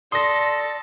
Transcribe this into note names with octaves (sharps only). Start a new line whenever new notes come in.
A4 D5 C6 D#6 A#6